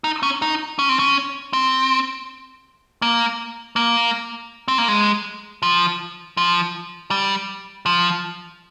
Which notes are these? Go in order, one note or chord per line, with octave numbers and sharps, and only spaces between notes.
D#4
C#4
D#4
C#4
C4
C#4
C4
A#3
A#3
C4
A#3
G#3
F3
F3
G3
F3